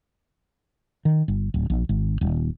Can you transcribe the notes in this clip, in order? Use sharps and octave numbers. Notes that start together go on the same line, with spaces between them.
D#3
G1
D1
A#1
G#1
D#1